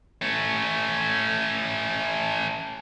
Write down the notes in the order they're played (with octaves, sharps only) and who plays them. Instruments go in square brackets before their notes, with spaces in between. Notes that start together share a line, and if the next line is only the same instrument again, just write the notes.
[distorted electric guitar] A3 C#4